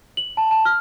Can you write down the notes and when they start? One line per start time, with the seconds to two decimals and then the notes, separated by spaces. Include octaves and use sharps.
0.17 F#7
0.37 A5
0.51 A5
0.65 F6